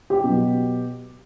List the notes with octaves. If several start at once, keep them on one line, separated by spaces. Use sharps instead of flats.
G4
B2 F#3